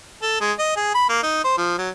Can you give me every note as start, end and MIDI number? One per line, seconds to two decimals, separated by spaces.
0.22 0.40 69
0.41 0.52 56
0.59 0.75 75
0.76 0.91 68
0.95 1.05 83
1.09 1.22 58
1.23 1.43 63
1.44 1.56 72
1.58 1.76 53
1.78 1.90 54